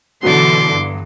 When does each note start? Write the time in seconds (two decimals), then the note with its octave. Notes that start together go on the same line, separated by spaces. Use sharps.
0.23 B2 D3 E3 F#3 B3 F#4 C6 D6
0.71 G2